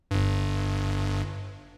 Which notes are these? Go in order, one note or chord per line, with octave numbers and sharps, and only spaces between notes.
G1 G2